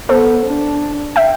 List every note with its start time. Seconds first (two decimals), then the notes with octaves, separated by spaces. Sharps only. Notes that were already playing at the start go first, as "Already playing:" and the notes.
0.09 B3 A4 C5
0.45 D4
1.16 E5 G5